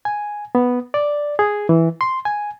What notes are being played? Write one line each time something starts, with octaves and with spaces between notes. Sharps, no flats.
G#5
B3
D5
G#4
E3
C6
G#5